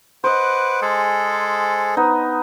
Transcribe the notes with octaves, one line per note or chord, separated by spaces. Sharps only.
B4 C5 D#5 F#5 D6
G#3 G#4 A4
B3 D#4